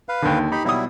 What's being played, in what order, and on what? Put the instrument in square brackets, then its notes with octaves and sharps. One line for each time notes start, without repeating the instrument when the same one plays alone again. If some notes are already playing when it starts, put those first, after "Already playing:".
[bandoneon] B4 F5
[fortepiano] D#2 D3
[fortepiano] D#4 [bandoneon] G4 B5
[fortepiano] B2 D#6 [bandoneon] F#3 G3 E4